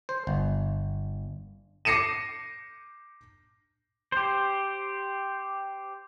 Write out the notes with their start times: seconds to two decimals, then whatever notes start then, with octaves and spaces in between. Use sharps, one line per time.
0.09 C5
0.27 G1
1.85 D6 A#6 C7 C#7 D#7 E7
4.12 G4 C5